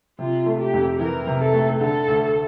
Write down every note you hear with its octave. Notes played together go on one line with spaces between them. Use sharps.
C3 F4
A3
G4
F2
E3 A#4
C3
A4
A3
D3 A4
D2